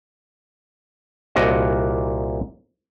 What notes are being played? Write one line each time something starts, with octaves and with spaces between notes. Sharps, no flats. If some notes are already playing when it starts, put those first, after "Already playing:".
C2 A#2 F#4 A#4 D#5 A5